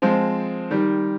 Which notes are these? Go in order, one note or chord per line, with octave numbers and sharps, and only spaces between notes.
F3 G#3 C4
D#3 G3